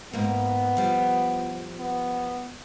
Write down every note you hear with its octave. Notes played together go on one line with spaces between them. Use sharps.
G#2 A#3 B3
F3 G3
B3